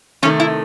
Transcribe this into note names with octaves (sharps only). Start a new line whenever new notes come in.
C3 D#3 A3 C#4
E4